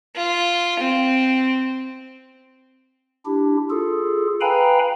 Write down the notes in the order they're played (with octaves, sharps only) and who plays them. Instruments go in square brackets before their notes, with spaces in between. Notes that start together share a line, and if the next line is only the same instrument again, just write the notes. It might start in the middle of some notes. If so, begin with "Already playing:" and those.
[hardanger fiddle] F4
C4
[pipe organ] D4 E4 G4
F4 G#4 A4
B4 F5 G5 G#5 A#5 B5